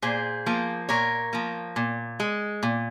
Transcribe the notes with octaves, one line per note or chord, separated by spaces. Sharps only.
A#2 G#4 C5
F3 A#3
A#2 A#4 C#5
F3 A#3
A#2
G#3
A#2